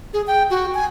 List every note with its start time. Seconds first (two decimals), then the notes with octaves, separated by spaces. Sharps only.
0.13 G#4
0.27 G5
0.50 F#4
0.74 G#5